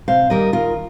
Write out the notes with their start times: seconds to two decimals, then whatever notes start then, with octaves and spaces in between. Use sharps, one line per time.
0.08 C3 C5 F5
0.30 D#3 G3 A#3 A#4 D#5
0.53 D#3 F4 A#4